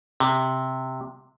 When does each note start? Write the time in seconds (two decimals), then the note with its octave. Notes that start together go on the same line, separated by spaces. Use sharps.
0.20 C3